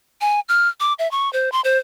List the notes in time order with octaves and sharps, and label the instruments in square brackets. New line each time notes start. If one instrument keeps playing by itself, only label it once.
[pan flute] G#5
F6
D6
E5
C#6
C5
C6
C5